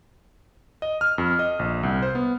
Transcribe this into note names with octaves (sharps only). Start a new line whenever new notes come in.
D#5
F6
F2
D#5
A#1
C2
C5
B3